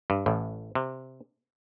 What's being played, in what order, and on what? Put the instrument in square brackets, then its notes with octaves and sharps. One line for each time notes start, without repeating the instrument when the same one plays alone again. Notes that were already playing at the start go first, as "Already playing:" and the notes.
[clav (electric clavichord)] G2
A1 A2
C3